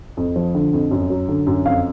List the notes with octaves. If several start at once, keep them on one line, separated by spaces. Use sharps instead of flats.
F2
F3
D3
F2
F#2
F#3
D3
F#2
F2 F5